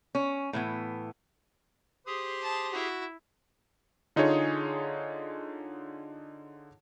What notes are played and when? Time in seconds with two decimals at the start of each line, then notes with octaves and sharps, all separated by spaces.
0.15 C#4
0.53 A2 E3 B3
2.06 G4 G#4 C5 D#6
2.42 A5
2.73 E4 F#4
4.16 D3 D#4 F4 G#4 C#5